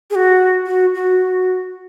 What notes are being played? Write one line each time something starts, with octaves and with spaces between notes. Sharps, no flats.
G#4
F#4
F#4
F#4